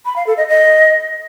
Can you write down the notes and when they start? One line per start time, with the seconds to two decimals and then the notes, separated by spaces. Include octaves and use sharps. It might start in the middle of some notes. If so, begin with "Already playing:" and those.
0.06 B5
0.16 F5
0.27 A4
0.37 D#5
0.48 D#5